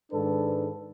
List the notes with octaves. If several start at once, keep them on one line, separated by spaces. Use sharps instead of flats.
G#2 D#3 D4 A4 B4